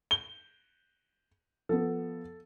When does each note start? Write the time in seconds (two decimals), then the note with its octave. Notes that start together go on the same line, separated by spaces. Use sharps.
0.11 G7
1.69 F3 B3 A4